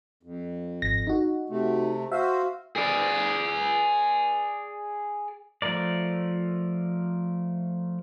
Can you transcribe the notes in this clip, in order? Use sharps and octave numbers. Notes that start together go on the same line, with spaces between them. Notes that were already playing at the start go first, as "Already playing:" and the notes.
F2
G#1 A#6
D#4 F#4
C3 A3
F#4 C5 E5 F5
G#4 D5
F3 A3 A#4 D5